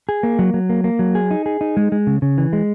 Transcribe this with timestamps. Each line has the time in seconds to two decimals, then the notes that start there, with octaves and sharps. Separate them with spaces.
0.09 G#4
0.23 A#3
0.39 F#3
0.54 F#3
0.69 A#3
0.84 A#3
0.99 F#3
1.15 G#4
1.31 D#4
1.46 G#4
1.61 D#4
1.77 G#3
1.92 G#3
2.07 C#3
2.22 C#3
2.38 E3
2.53 G#3